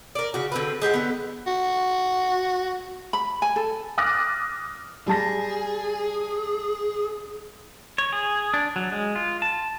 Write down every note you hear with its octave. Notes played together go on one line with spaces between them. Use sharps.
A#4 D5
C#3 F#4
D3 C4 B4
G#3 G4 C5 F#5
D3 B3
F#4
B5
G#5
A4
D6 D#6 F6 F#6 A6 A#6
G3 G#4 A5 A#6
C#5
G#4
D4
F#3
G#3
F4
A5